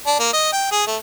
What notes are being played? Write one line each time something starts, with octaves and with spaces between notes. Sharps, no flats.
D4
A#3
D#5
G5
G#4
A3